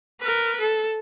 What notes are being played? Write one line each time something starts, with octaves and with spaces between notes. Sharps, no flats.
A#4 B4
A4